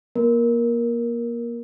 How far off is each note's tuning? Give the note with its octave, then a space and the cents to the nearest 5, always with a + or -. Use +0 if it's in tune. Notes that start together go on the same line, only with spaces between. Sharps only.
A#3 +30 A#4 +10